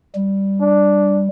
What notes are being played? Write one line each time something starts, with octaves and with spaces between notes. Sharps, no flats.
G3
D4